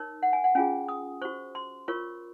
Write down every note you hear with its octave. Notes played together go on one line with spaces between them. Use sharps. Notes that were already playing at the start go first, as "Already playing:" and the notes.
Already playing: D#4 A#4 C#5
F#5
G#5
F#5
C#4 F4 G#4 G#5
D#6
F#4 C5 C#6
C6
F4 A#4 C#5 C#6